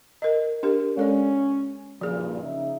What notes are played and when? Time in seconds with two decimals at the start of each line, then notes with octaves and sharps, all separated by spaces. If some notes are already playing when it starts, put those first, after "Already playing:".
0.22 A#4 D#5
0.63 D4 G4 A#4
0.97 G#3 C#4 A4 D5
2.01 F#1 G2 A#2 F3 G#4
2.43 C#3 D#4 E5